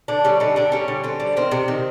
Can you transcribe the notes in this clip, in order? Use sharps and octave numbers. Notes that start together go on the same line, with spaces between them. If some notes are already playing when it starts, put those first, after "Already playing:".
D3 D4
G3 C#4
D3 D#4
D3 D4
G3 C#4
D3
D3 C4
G3
D#3 C4
C3
D#3